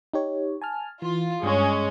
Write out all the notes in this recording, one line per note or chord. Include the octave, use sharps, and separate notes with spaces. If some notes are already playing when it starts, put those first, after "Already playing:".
D#4 G4 C#5
G#5 A5 F6
E3 F4
G2 G#3 C#4